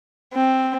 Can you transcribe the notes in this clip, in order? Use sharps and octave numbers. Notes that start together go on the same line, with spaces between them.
C4